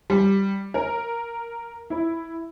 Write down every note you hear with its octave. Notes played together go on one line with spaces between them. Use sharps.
G3
A#4
E4